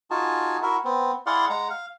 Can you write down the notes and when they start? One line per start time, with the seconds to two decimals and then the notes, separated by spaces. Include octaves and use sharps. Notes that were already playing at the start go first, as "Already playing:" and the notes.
0.11 D#4 F4 F#4 G#4 G#5 A5
0.62 E4 F#4 A#4 E5
0.84 B3 C4
1.26 E4 G#4 D5 F5 F#5 C6
1.50 G#3 F#5 A#5
1.70 F5